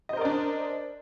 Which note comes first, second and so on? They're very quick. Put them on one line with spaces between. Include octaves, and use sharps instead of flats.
D#5 C5 A#4 D5 D4